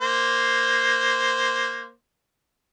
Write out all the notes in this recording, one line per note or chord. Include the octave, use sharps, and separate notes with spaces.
A#3 C5